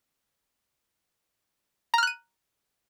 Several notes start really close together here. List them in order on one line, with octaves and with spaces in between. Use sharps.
A#5 F6 F#6 D#7